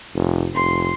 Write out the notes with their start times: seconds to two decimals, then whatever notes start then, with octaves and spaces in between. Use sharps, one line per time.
0.14 F1
0.54 F1 C6